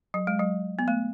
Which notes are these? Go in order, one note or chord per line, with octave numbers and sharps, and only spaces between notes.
F#3
G#3
F#3
B3
A3